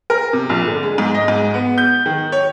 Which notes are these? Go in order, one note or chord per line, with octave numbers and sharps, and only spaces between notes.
A#4
C3
A#1
D3
G#3
G#2
D#5
G#2
B3
G6
D#3
C#5